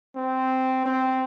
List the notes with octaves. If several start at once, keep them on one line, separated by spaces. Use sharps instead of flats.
C4
C4